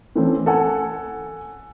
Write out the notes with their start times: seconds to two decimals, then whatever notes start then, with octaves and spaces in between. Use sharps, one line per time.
0.16 E3 A3 C4 C#4
0.46 A4 F#5 G#5